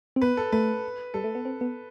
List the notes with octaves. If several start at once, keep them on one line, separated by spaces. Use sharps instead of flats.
C4
B3 B4
A4
A3 B4
G3 A4
A3
B3
C4
B3